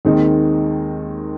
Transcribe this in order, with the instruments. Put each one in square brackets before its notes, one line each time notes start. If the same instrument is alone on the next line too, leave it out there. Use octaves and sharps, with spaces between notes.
[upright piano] D#2 D#3 G#3 C4 D#4